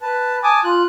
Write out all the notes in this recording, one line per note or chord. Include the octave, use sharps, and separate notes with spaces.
B4 A5
G#5 A5 D6 D#6
F4 F#6